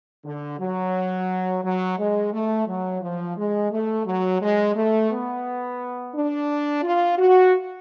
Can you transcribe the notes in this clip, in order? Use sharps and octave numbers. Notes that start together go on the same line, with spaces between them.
D3
F#3
F#3
G#3
A3
F#3
F3
G#3
A3
F#3
G#3
A3
B3
D4
F4
F#4